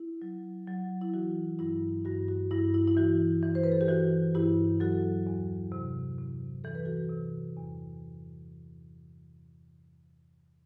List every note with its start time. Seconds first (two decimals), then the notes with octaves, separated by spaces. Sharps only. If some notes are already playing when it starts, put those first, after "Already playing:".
Already playing: E4
0.22 F#3
0.67 F#3
1.02 E4
1.14 E3 F#4
1.59 G2 E4
2.05 G2 F#4
2.28 F#4
2.51 G2 E4
2.74 E4
2.88 E4
2.97 E3 F#4
3.43 E3
3.55 C5
3.63 B4
3.72 A4
3.81 G4
3.88 E3 F#4
4.35 G2 E4 G4
4.80 F#3 F#4 A4
5.27 E2
5.72 C3
6.19 C3
6.64 E3 A4
6.75 B4
6.85 F#4 A4
7.09 C3
7.57 E2